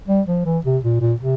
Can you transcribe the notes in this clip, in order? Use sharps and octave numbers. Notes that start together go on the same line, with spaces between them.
G3
F3
E3
C3
A#2
A#2
C3